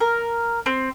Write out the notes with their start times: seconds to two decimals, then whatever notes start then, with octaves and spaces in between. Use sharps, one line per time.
0.01 A#4
0.66 C4